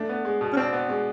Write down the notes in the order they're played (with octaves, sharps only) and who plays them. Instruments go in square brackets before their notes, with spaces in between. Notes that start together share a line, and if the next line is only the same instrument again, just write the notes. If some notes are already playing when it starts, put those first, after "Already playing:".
Already playing: [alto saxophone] A3 [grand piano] D4
[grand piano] B3
G#3
B2
[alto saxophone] C#4
[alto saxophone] C4 [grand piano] D4
[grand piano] B3
G#3